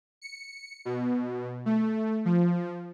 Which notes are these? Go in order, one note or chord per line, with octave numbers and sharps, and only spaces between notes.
C#7
B2
A3
F3